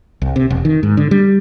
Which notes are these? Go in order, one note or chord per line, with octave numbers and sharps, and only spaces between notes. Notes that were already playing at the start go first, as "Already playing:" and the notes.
C2
C3
E1
D#3
G#2
D3
G3